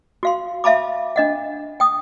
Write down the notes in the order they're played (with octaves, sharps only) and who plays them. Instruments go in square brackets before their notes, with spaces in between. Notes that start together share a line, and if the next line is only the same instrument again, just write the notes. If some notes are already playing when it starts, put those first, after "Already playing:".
[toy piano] F#4 F5 C6
E5 F5 A5 B5 D6
D4 D#5 F#5
G5 D#6